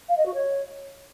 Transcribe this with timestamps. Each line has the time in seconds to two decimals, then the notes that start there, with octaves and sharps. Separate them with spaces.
0.09 F5
0.17 D#5
0.26 F#4
0.34 C#5